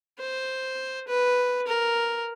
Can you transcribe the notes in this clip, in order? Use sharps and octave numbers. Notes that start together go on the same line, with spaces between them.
C5
B4
A#4